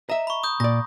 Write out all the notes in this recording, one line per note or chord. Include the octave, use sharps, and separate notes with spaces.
D#5 E5 A#5
B5 C#6
D#6 G6
A#2 D5 A#6